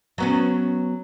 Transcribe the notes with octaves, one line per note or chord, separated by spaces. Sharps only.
F#3 B3 C#4